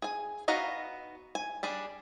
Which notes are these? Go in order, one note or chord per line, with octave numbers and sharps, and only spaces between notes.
G#4 G#5
B3 D#4 F#4 F5 A#5
G#5
G3 D4 G#4